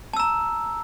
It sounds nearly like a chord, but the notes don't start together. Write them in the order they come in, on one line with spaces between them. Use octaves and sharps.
A5 E6 A#5